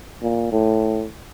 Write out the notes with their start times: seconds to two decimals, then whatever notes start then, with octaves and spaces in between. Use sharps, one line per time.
0.22 A#2
0.52 A2